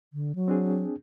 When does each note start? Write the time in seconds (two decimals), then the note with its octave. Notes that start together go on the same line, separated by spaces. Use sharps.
0.13 D3
0.35 F#3
0.48 C4 D4 G#4